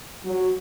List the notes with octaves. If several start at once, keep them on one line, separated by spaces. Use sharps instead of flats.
F#3